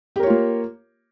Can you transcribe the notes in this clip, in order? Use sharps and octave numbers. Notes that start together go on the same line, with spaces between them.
A#3 F4 G4 A#4 C#5